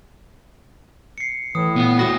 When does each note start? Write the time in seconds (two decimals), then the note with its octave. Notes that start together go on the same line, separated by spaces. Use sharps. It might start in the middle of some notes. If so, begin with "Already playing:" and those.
1.18 C7 C#7
1.55 A2 E3 D#6
1.76 A#2 B3 F#5
1.99 A3 F#4 D#6 A#6